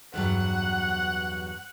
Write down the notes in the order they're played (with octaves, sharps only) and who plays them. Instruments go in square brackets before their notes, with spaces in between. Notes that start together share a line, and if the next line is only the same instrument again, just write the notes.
[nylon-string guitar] E2 G2 F#3 [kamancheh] F#5